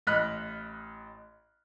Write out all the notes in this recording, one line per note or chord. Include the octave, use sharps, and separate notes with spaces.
A1 D#5 B5 F6 F#6 B6